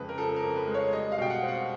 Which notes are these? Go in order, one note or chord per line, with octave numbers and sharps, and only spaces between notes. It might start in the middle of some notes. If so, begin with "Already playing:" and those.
Already playing: F2 C#3 G#3 B4
A#4
F3 A4
A#4
F2
B4
G#3
C#5
G3 D#5
F5
B2 G5
F#5
C4
F#5